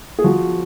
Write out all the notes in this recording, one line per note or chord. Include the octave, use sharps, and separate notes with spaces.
G#4
F3 F#4